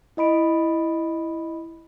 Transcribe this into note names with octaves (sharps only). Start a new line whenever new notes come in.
E4 D#5 B5 D7